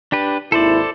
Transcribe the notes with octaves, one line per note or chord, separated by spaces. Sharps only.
D4 G4 B4
G#1 D#2 E4 A4 C5 D5